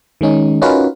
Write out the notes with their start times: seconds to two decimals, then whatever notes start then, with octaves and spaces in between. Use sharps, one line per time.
0.21 D#3 G#3 C#4 D#4
0.62 C#4 D#4 F4 F#4 A#4 B4